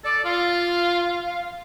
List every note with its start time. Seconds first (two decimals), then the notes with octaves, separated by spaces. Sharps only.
0.04 A4 D5
0.25 F4 F5